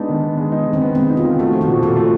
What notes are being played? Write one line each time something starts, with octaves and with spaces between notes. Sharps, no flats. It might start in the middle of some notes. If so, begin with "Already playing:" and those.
Already playing: G#3 B3 D4 D#4
D#3
B3
G#3
D#4
D#3
C4
B3
G#3 C4
D#4
F4
D#3
A3 F#4
F3
F#4
A#2
A#2 A4
A3